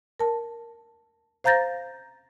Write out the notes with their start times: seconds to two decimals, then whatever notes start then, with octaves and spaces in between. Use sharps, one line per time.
0.19 A#4 A5
1.44 C5 F5 A#5 G6 A6 A#6